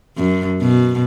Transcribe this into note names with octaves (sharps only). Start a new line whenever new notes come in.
F#2
B2